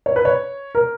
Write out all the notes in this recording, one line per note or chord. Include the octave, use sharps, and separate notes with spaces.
C#5
B4
C#5
A#4